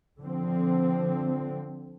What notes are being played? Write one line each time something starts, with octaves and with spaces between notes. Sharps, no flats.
D3 F3 C4